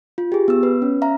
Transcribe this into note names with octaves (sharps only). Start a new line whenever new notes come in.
F4
G4 G#4
B3 E6
B4
C#4
E5 F5 A#5